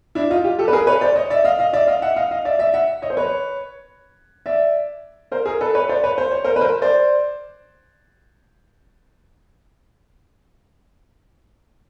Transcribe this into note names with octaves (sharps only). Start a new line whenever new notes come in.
D4 E4
D#4 F4
F4 G4
G4 A4
B4
G#4 A#4
B4 C#5
C5 D5
C#5 D#5
D5 E5
D#5 F5
D#5 F5
D5 E5
D#5 F5
E5 F#5
D#5 F5
D#5 F5
D5 E5
D5 E5
E5 F#5
C#5 D#5
C5
B4 C#5
D5 E5
A#4 C5
G#4 A#4
A4 B4
B4 C#5
C5 D5
B4 C#5
C5
C#5
A#4 C5
B4
A#4 C5
C5 D5